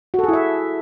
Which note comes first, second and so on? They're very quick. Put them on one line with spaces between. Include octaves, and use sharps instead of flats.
F#4 A4 G#4 E4 E5